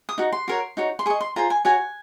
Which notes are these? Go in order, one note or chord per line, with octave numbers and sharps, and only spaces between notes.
D#6
D#4 F#4
C6
F#4 A#4 C#5
D#4 F#4 C#5
C6
G#4 D#5 C#6
C6
F4 G#4 C5 A#5
G#5
F#4 C#5 G#5